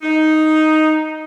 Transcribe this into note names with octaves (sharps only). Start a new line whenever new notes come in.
D#4